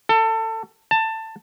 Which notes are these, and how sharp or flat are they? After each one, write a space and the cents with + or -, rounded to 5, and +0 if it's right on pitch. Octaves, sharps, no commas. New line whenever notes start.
A4 +25
A5 +15